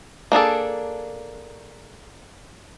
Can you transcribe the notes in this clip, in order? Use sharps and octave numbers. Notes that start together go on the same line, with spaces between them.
A#3 D4 G#4 A4